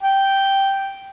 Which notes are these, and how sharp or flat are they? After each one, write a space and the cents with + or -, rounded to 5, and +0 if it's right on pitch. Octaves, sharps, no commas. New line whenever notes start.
G5 -5